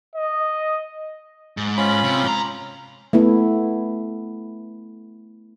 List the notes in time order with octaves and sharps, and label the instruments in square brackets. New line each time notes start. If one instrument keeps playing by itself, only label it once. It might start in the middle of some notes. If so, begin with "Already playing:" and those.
[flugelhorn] D#5
[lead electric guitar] G#2
[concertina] C#4 F4 B5
[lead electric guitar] C3
G#2 A#5
[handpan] A3 B3 E4